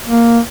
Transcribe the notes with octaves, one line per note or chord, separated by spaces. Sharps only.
A#3